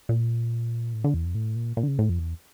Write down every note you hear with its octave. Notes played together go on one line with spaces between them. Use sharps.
A#2
A2
D3
E2
F2
A2
A#2
A#2
D3
C#3
A2
F2
E2